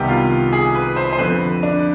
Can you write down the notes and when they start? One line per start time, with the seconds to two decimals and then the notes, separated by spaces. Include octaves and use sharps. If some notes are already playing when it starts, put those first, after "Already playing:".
Already playing: C2 C3 D#3 G3 B3 G4
0.08 F4
0.52 G#4
0.75 B4
0.96 C5
1.13 C5
1.18 F2 D3 F3 C4 B4
1.63 D4